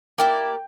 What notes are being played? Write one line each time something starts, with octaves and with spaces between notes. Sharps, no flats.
A#3 E4 G4 D5 G5